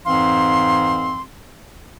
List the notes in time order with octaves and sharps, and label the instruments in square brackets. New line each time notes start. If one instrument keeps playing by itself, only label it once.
[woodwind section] F2 G#2 E3 C4 F5 C6